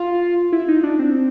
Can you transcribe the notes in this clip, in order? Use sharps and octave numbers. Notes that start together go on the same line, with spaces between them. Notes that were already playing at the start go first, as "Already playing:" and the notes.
Already playing: F4
E4
D#4
D4
C4